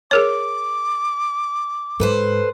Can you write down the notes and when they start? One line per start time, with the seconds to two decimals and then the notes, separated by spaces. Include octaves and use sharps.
0.11 G#4 A#4 C#5 D6
2.00 G#2 A4 B4 C5